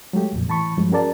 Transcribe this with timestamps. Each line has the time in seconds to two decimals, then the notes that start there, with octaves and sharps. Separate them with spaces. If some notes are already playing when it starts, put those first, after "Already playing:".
0.13 F#3 G#3 A3 G4
0.33 C2 F2 A#2
0.48 A2 E3 A5 B5 C#6
0.77 G2 F3 F#3 G#3
0.91 C#4 F#4 G#4 A#4 D5 A5